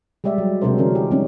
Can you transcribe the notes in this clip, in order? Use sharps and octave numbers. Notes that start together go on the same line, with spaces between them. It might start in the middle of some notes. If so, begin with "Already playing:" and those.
G3 G#3 G4 D5 E5
F#3
C3 F#3 G#3 D4 A#4 C5
D3 E3 C#4 A#4
G4
F3 G3 G#3 C4 C#4 D#4